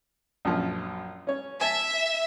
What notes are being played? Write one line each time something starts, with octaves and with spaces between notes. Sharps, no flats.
A#1 F#2 F3
C#4 C#5
E5 G#5 A5